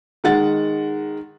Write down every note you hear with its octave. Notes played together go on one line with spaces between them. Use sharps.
D#3 G#3 F#5 A6